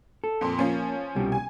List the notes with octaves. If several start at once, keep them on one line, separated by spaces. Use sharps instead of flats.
A4
F2 A#2
F3 A#3 C#4
C2 B2 G3
G#5